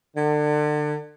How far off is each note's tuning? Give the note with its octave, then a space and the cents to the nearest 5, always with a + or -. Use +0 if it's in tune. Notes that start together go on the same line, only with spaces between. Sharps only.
D3 +30